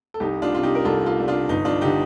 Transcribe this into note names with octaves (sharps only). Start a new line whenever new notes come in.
A4
C2 D#4 G4
D4 F4
C3 G3 F4
D#4 G4
A#4
C2 F4 A4
F4 A4
C3 G3
D4 F4
G1 D#4
D4 F4
D3 D#4 G4